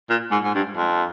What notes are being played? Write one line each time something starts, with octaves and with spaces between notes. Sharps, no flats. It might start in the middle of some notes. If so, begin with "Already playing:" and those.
A#2
G#2
G#2
G2
F2